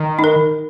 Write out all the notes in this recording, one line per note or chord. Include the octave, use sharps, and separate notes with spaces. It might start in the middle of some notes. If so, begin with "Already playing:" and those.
Already playing: D#3
D#4
A#4